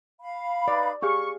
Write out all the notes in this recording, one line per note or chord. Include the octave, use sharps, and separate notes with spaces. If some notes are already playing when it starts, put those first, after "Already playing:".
F5 B5
D#4 B4 D5
G4 G#4 F5 C#6